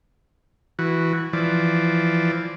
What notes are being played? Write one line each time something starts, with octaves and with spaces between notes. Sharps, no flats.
E3 F#4
E3 F3 D5